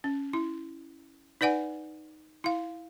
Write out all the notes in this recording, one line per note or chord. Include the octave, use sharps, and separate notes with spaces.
C#4
E4
D#4 B4 D5 F#5 G#5
E4 F5